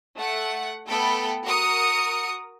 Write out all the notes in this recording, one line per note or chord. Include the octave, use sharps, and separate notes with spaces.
A3 F#5
A3 B3 A4 G5 B5
F#4 A#4 D#6 C#7